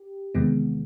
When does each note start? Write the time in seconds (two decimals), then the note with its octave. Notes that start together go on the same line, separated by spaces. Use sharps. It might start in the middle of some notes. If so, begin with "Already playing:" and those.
Already playing: G4
0.35 E2 C3 D#3 G#3 B3